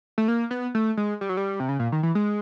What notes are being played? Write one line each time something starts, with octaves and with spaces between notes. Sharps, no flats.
A3
A#3
B3
A3
G#3
G3
F#3
G3
C3
C#3
A#2
D#3
E3
G#3